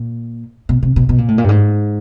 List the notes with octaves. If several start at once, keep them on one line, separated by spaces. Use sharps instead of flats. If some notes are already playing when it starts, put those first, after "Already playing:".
Already playing: A#2
B2
C3
B2
B2
A#2
A2
A#2
G2
G#2